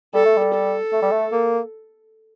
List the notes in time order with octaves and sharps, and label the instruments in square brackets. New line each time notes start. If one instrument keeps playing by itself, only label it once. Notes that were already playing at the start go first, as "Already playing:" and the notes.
[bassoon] G3 [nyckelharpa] A4
[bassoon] A3
G3
[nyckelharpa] A4
[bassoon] A3
G3
A3
A#3